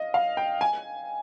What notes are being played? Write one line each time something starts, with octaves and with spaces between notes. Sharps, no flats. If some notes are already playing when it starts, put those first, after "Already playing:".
Already playing: D#5 F5
F5
G5
G#5